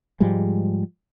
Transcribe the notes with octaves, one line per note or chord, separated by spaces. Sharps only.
G#2 F3 G3 G#3